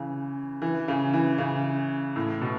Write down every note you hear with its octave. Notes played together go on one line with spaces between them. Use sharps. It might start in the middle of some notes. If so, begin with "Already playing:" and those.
Already playing: C#3 E3
E3
C#3
E3
C#3
A2
B2